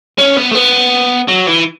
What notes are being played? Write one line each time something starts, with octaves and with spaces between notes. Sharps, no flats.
C#4
B3
A3
B3
F#3
E3